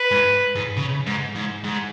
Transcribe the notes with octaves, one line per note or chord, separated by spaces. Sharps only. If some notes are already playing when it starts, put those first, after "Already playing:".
Already playing: B4
G#2
G#2
C#3
G#2
G#2
G#2